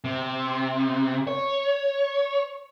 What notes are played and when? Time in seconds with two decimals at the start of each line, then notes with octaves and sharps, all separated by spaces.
0.04 C3
1.27 C#5